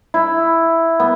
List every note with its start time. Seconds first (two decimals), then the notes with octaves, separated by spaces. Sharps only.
0.14 E4
1.00 B3